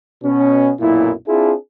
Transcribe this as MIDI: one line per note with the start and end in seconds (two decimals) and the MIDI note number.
0.23 0.70 47
0.23 0.70 61
0.80 1.12 35
0.80 1.12 42
0.80 1.12 46
0.80 1.12 64
1.28 1.53 60
1.28 1.53 62
1.28 1.53 64
1.28 1.53 65
1.28 1.53 68